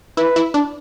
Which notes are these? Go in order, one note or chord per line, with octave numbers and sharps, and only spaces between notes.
E4 B4
E4
D4